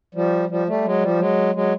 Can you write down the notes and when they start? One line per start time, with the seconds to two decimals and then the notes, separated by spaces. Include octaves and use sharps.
0.15 F3 G3
0.49 F3 G3
0.67 G3 A3
0.85 F#3 G#3
1.01 F3 G3
1.19 F#3 G#3
1.55 F#3 G#3